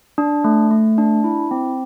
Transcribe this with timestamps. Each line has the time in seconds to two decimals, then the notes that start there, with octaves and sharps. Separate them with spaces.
0.18 D4
0.44 A3
0.71 A3
0.98 D4
1.24 E4
1.51 C4